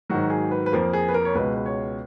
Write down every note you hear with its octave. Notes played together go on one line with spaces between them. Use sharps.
G#2 D#3 F#3 F#4
G#4
B4
B4
F2 F3 A#3 A#4
G#4
B4
A#4
C#5
C#2 B2 G#3 B4
B4
C#5